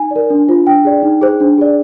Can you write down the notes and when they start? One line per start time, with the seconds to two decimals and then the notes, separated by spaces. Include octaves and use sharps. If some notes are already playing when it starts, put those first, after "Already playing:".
Already playing: D#4 G#5
0.11 A#4 D5
0.30 D4
0.48 F4 C5
0.67 D4 G5
0.85 G#4 D5
1.03 D#4
1.22 G#4 C5
1.40 D4
1.58 G#4 D5